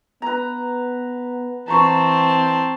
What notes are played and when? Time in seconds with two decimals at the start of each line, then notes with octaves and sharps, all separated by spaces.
0.22 B3 B4 A#5
1.68 E3 C4 A5 A#5 C#6